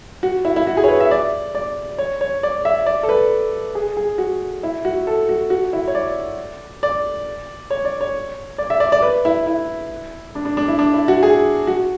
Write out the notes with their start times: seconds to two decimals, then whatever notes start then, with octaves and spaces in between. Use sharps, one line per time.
0.23 F#4
0.45 E4
0.56 E4
0.67 F#4
0.77 G#4
0.84 C#5
0.88 B4
1.00 E5
1.11 D5
1.55 D5
1.98 C#5
2.21 C#5
2.43 D5
2.65 E5
2.86 D5
3.03 A4
3.09 B4
3.75 G#4
3.97 G#4
4.18 F#4
4.63 E4
4.85 F#4
5.07 A4
5.29 F#4
5.50 F#4
5.73 E4
5.88 C#5
5.95 D5
6.83 D5
7.70 C#5
7.85 D5
8.01 C#5
8.58 D5
8.70 E5
8.80 D5
8.92 D5
9.02 B4
9.25 E4
9.47 E4
10.35 D4
10.45 D4
10.57 D4
10.68 E4
10.79 D4
10.94 E4
11.08 F#4
11.23 G#4
11.67 F#4